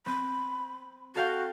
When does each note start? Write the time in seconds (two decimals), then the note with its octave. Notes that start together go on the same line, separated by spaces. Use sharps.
0.06 C4 B5
1.16 F#4 A4 F5 G5